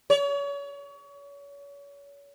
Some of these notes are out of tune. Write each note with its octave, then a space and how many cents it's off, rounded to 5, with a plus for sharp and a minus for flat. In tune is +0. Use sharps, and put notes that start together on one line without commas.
C#5 +35